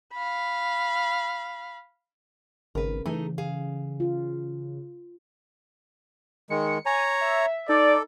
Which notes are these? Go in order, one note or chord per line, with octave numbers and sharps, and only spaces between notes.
F5 B5
G#1 C#3 A#4 B4
E3 A3 D#4 G#4
G#4 F5
F4
D#3 G#3 C#7
C#5 G#5 A#5
E5
D#4 A4 D5